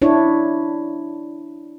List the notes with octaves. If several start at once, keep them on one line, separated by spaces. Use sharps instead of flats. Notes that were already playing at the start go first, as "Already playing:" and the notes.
D4 E4 C#5